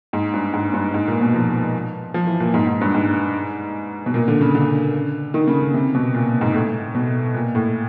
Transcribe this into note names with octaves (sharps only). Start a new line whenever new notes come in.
G#2
G2
G#2
G2
G#2
A#2
B2
F3
F3
E3
A#2
G#2
G#2
G2
G#2
B2
A#2
D3
C#3
D3
D#3
C#3
C#3
C3
B2
A#2
G#2
A2
B2
A#2
A2